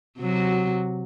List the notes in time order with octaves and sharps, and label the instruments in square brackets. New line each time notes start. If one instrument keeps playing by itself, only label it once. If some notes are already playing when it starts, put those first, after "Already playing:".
[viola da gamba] C3 F#3 F#4